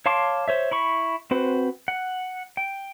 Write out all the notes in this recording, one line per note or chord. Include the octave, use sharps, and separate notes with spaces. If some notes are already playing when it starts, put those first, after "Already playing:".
C#5 F5 A5 C6 D6
C5 C#5 E5
E4 B5 C#6
C4 F#4 B4 C5
F#5
G5